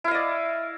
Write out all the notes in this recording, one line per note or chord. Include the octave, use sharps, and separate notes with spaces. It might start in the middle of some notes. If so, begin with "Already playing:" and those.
E4 D5 D#5 F5